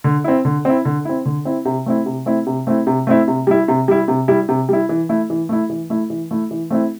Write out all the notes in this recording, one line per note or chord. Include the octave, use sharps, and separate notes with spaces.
D3
C4 E4
D3
C4 E4
D3
C4 E4
D3
C4 E4
C3
A3 C4 E4
C3
A3 C4 E4
C3
A3 C4 E4
C3
A3 C4 E4
C3
G3 E4
C3
G3 E4
C3
G3 E4
C3
G3 E4
E3
A3 E4
E3
A3 E4
E3
A3 E4
E3
A3 E4
E3
A3 C4 E4